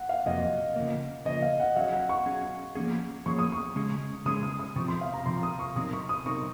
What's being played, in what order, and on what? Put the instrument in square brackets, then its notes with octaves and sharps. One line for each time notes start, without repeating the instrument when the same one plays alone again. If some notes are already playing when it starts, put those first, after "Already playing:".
Already playing: [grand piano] F#5
F5
[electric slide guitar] F2 C3 F#3 A#3 [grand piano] D#5
[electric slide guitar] C#3 F3 A#3
[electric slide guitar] C#3 F3 A#3 [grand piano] D#5
[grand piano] F5
F#5
[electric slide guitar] F#3 C#4 G#4 [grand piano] F5
[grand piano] F#5
C#6
[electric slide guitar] F#3 C#4 G#4
F3 A#3 C#4 G#4
[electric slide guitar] F3 A#3 C#4 G#4 [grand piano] C#6
[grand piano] D#6
C#6
[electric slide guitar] C#3 G#3 C#4 G#4
[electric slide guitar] C#3 G#3 C#4 G#4 [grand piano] D#6
[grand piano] D#6
D#6
[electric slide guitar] C3 F3 C4 [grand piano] C#6
[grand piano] C6
F5
A#5
[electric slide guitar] C3 F3 C4 [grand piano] C6
[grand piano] D#6
C#6
[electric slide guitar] C3 F#3 C4 D#4 A#4 [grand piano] D#6
[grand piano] C#6
D#6
[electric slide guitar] C3 F#3 C4 D#4 A#4 [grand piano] C#6